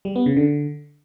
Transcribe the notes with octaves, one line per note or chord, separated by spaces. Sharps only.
G3
B3
C#3
D3